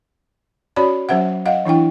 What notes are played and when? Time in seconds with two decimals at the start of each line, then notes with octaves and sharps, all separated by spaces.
0.76 C#4 F#4 C#5 D5 B5
1.09 F#3 C#4 C5 E5 F#5
1.46 D#5 F5 F#5
1.65 E3 D4 E4 G5